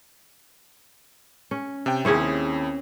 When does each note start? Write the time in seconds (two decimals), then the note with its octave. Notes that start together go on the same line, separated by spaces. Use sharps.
1.51 C#4
1.86 C3 G5
2.05 D#2 C4 C#4 E4 G#4